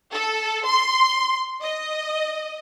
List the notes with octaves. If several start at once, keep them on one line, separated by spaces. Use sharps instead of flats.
A4
C6
D#5